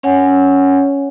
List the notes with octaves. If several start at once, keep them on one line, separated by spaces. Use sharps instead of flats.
C#4 C#5 F#5 G#5